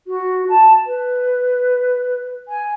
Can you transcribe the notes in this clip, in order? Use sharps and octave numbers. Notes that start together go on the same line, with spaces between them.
F#4
A5
B4
G#5